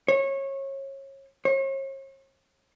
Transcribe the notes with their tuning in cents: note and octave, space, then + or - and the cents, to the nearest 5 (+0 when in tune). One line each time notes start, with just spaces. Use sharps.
C#5 -25
C#5 -40